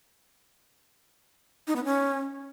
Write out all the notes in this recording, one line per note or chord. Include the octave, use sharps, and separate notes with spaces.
D#4
B3
C#4